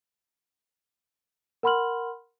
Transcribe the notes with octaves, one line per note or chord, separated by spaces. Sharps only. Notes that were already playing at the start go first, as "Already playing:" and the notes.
A#4 F#5 B5 C6 F6 F#7